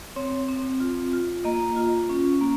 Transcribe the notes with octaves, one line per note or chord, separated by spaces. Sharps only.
C4 C#5
C4
F4
F4
A#3 D#5
F4
C#4
A#3